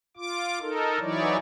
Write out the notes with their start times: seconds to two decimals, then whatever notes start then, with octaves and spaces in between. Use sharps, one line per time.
0.17 F4 D6
0.61 D#4 A4 A#4
0.99 E3 F#3 D#4 E4 C#5 D5